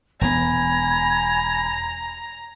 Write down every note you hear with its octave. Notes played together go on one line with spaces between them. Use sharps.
E1 E2 B3 G#5 A#5 B5 G#6